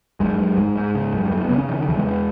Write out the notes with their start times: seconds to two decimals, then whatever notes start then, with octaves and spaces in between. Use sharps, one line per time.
0.20 F#2 G#3
0.39 F#2
0.58 G#2 G#3
0.77 G#2
0.95 C#3
1.13 F#2
1.31 F#2 A3
1.44 B3
1.50 C#3
1.57 C#4
1.69 C#3 E3
1.79 D#3
1.88 E2 E3
1.97 G#3